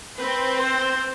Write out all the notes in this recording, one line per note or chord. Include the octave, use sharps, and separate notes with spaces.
C4 B4
C5